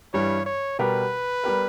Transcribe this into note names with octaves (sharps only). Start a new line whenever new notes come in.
G2 E3 G3 C#5
C#5
B2 G3 B3 G4 A#4 B4
G3 B3 G4 A#4